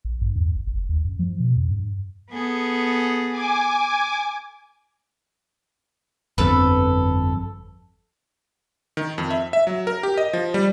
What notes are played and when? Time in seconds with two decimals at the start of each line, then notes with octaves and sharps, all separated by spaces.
0.05 A1
0.21 G2
0.36 E2
0.55 G#1
0.67 F#1
0.89 D#2
1.04 F#2
1.19 F3
1.40 B2
1.56 F2
1.69 G2
2.30 B3 G#4 A4
3.31 G#5 D6
6.38 G1 F2 A4 B4
8.97 D#3
9.18 F2
9.31 E5
9.53 E5
9.67 F#3
9.87 A#4
10.03 G4
10.18 D#5
10.33 F3
10.54 G3